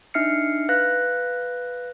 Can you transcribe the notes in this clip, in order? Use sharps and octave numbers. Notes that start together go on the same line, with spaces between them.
D4 D#4 E5 F6 C7 C#7
B4 F5 F#6 A#6